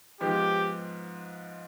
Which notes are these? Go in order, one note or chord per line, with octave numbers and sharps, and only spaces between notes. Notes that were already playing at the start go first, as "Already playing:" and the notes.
G#2 F3 G#3 B3 G4